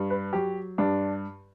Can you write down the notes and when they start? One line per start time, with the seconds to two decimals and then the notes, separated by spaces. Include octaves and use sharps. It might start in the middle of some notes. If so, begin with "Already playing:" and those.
Already playing: G2
0.10 B4
0.33 F#3 G4
0.78 G2 D4